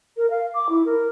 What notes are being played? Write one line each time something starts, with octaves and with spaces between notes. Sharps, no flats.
A#4
F5
D6
E4
A#4